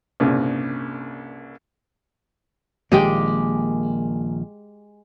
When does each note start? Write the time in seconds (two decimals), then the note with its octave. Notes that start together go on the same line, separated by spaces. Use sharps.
0.20 C2 G2 A#2 C#3
2.92 A#1 D#3 G#3 A#3 G4 G5